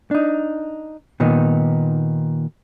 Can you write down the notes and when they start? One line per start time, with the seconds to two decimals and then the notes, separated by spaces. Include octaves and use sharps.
0.11 D4 D#4
1.20 A#2 D#3 B3 D#4